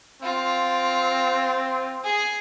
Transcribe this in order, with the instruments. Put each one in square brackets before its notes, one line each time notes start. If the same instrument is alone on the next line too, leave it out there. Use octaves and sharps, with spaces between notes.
[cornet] C4 [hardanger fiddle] F4
[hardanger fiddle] G#4